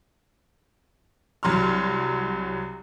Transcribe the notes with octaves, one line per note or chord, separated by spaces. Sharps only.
C2 F#3 C6 F6